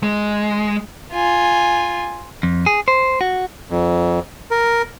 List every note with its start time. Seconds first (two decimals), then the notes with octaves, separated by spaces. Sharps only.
0.03 G#3
1.12 F4 G#5
2.43 F2
2.66 G#4
2.88 C5
3.21 F#4
3.70 F2
4.51 A#4